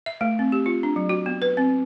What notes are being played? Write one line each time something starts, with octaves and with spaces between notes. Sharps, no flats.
E5
A3
C4
G4
F4
D4
F#3
F#4
B3
B4
C4